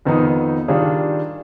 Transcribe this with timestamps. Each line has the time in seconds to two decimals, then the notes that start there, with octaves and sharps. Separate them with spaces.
0.05 F2 D#3 B3 D#4
0.68 D#3 G3 D4 F4 G#4